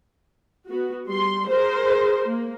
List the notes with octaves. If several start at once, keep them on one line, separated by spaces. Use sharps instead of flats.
B3 F#4
G3 C6
G#4 A#4 C5
A#3